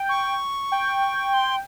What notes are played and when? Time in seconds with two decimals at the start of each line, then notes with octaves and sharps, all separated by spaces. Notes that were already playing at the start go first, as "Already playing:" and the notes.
Already playing: G5
0.09 C#6
0.72 G5
1.34 C6